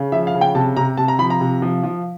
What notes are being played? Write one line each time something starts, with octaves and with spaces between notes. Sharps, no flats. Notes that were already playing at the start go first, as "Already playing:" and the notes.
Already playing: C#3
F3 E5
F5
C#3
G5
C3 A5
C3 A#5
C3 A5
A#5
F3 B5
A#5
C3
F3
F3